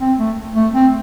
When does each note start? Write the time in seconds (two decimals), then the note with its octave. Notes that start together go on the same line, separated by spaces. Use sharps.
0.01 C4
0.19 A3
0.56 A3
0.74 C4